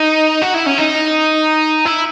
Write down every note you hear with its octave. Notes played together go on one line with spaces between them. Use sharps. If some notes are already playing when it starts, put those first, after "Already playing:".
Already playing: D#4
F#4
E4
C#4
D#4
E4